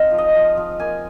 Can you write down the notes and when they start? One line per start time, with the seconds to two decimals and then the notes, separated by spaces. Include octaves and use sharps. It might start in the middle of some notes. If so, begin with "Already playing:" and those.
Already playing: G#3 C4 D#4 F5
0.11 F3
0.18 D#5
0.35 F3
0.57 F3
0.80 A#3 G#5